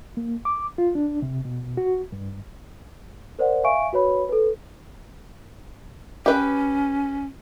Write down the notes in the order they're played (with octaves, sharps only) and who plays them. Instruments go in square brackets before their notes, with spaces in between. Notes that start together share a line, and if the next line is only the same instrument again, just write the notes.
[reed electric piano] A#3
D6
F4
D4
C3
B2
F#4
G2
[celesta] A#4 C5 D5 F#5
E5 F5 G#5 C#6 D7
F#4 B4 C#5 B5
A4 B4
[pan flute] C#4 [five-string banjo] G4 B4